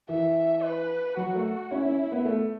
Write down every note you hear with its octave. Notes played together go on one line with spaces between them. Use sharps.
E3 E5
B4
F#3 F#4
A3
C#4 E4
C#4
B3
A3